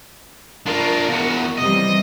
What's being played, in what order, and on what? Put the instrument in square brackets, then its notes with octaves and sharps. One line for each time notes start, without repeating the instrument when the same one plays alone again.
[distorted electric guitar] D4 F4 [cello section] A#4
[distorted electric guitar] E2 F#4
[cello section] C3 E3 G3 [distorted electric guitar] D#5